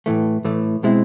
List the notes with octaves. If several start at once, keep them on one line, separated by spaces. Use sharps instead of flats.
A2 E3 A3
A2 E3 A3
B2 G#3 C4 E4